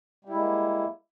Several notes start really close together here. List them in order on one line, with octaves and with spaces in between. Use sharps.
G3 E4 G#3 A#3